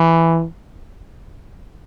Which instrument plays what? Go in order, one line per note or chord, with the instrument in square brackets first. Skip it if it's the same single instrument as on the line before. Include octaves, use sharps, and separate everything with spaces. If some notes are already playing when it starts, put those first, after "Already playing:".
Already playing: [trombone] E3